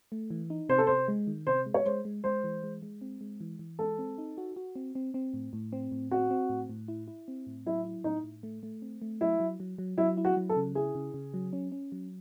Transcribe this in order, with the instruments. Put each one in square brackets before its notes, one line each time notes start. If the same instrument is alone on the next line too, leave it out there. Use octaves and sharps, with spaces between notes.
[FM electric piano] A3
E3
D#4
[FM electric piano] C3 [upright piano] C5
[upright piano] A4
[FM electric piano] C3 [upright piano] C5
[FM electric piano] G#3
D#3
[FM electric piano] C3 [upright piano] C5
[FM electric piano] G#3
[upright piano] C#5
[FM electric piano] G#3 [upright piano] C5
[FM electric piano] G#3
[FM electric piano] G#3 [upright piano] C5
[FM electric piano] E3
G#3
G#3
C4
G#3
E3
E3
[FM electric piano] G#3 [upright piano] A4
[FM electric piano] C4
D#4
F#4
F#4
C4
C4
C4
A2
A2
C4
A2
[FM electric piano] C4 [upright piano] F#4
[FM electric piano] C4
A2
A2
E4
E4
C4
A2
[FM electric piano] F#3 [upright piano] E4
[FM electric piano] E4
[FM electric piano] A2 [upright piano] D#4
[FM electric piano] A2
A3
A3
C4
A3
[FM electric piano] F#3 [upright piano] E4
[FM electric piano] F#3
F#3
F#3
[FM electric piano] F#3 [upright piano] E4
[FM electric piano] E4
[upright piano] F#4
[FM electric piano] F#3
[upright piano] A4
[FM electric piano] C#3
[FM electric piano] E4 [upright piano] G#4
[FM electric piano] C#3
C#3
F#3
C#4
C#4
F#3